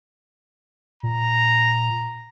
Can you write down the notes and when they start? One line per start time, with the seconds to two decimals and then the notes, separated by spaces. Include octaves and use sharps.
1.03 A#2 A#5